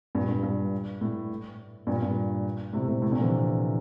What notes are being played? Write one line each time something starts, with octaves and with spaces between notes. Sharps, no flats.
G2 A#2
G2
G2
A2
G2 A#2
G2 A#2
A2 C3
A2 C3
A2 C3
A#2 D3
F3
C3 E3